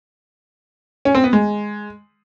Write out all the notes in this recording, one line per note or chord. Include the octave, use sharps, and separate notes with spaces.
C#4
C4
B3
G#3